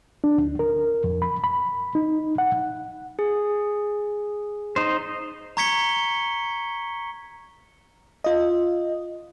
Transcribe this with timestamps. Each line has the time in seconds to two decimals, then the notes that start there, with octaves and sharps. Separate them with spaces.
0.24 D4
0.38 D2
0.59 A#4
1.04 F2
1.22 B5
1.44 B5
1.95 D#4
2.38 F#5
3.19 G#4
4.76 D#4 C5
5.57 A#5 C#6 G#6 B6 C#7 G7
8.24 F4 D#5